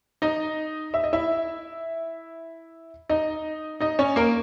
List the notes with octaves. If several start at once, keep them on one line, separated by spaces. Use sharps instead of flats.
D#4 D#5
E5
D#5
E4 E5
D#4 D#5
D#4 D#5
C#4 C#5
A#3 A#4